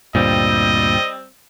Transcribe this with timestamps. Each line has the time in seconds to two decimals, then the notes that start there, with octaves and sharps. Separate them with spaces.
0.15 D2 G2 A#2 G3 C4 D#5